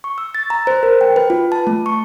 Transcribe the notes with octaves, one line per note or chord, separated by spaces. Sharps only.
C#6
E6
A6
A#5
C5
A#4
G5
B4
F4
A5
A3
C#6